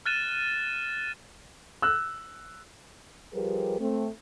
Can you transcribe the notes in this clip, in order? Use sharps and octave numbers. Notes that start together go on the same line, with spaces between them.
F6 F#6 A6 D#7 E7
E6 F#6
F3 G3 G4 G#4 A#4 B4
A3 C4